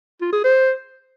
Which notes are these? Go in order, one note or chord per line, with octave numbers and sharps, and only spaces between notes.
F4
G#4
C5